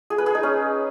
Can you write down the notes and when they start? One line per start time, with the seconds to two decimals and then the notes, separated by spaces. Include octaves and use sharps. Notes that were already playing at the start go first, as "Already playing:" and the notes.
0.10 G#4
0.18 B4
0.26 G#4
0.35 D#4
0.43 C#4